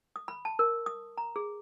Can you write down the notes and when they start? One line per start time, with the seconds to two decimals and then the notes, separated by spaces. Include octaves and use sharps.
0.16 D#6
0.28 B5
0.45 A5
0.59 A#4
0.86 D#6
1.18 A#5
1.36 G#4